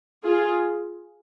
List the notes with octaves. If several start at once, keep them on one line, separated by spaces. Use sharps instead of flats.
F4 G#4